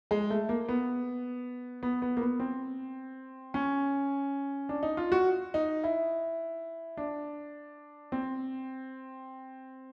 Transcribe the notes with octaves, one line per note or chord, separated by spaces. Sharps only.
G#3
A3
A#3
B3
B3
B3
A#3
B3
C4
C#4
D4
D#4
F4
F#4
D#4
E4
D4
C4